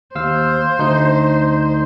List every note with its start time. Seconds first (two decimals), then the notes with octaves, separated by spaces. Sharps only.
0.15 D#2 C5 F5 E6
0.79 D2 D#4 G6